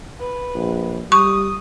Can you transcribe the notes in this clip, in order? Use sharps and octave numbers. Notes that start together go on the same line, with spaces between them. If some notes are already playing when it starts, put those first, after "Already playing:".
B4
A#1
G3 C#6 D#6